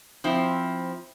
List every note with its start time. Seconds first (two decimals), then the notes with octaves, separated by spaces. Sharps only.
0.24 F3 C4 E4